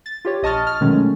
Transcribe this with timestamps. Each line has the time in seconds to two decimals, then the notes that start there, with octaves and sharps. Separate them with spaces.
0.06 A6
0.25 F4 G4 C#5
0.43 A#1 D#5 A5 C#6 F6 A6
0.67 F6
0.81 B2 D#3 F#3 G#3 A3 C#4